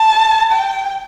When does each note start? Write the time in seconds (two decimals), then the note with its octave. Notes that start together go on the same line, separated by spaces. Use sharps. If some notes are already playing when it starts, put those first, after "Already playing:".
Already playing: A5
0.52 G5